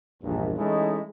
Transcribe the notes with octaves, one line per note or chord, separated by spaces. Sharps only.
A#1 E2 G2
E3 G#3 A3 C#4 D#4 E4